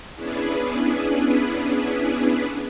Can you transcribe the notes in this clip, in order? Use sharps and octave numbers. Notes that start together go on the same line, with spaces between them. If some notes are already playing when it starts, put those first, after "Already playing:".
B3 C#4 D4 E4 G#4 B4